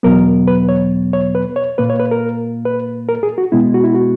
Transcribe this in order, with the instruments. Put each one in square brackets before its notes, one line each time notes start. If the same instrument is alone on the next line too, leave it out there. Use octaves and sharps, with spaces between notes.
[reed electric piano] E2 B2 F#3 B3 A#4
B4
C#5
C#5
B4
C#5
A#2 A#3 B4
C#5
B4
A#4
B4
A#4
G#4
F#4
B2 G#3 B3 E4
F#4
E4
F#4